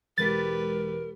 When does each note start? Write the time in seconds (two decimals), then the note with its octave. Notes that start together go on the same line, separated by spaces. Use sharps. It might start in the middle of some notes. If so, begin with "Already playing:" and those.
0.18 E1 G#3 G4 A#4 B4 A6 B6